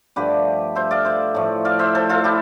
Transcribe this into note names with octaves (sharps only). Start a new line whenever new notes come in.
G2 D3 F3 A3 G4 B4
C5 E5
D5 F5
C5 E5
A2 F3 A3
D5 F5
C5 E5
A4 C5
F4 A4
E4 G4